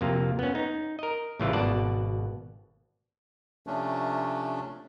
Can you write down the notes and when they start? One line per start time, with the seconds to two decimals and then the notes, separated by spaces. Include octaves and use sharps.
0.01 F2 C3 A#3 F4
0.39 B3 C#4
0.55 D#4
0.99 A#4 D#5
1.40 A1 C#3 E3 G3 F4
1.53 G#1 B2 D5 F#5 A5
3.67 C3 F3 A3 C#4 D4